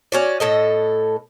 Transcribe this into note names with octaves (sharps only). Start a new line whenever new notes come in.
C#4 F#4 D5
A2 A4 D#5